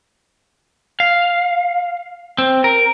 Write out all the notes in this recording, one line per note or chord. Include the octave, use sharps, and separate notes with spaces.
F5
C4
A#4